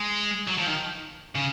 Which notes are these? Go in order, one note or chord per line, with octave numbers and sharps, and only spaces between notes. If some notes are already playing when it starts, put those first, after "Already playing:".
Already playing: G#3
F#3
F3
D#3
C#3